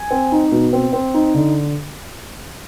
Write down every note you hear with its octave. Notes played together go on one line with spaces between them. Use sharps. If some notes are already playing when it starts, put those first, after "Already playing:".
Already playing: G#5
C4
D#4
B2
C4
C4
D#4
D3